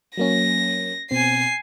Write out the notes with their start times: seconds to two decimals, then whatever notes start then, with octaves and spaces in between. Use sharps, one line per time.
0.18 F#3 A#3 C#4 A#6
1.11 B2 C4 G#5 C7